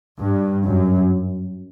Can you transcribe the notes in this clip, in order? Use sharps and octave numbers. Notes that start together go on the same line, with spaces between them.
G2
F#2